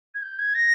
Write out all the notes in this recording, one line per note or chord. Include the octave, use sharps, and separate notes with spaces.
G#6
G6
G#6
A#6